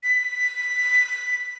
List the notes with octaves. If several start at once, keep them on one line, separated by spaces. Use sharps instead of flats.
B6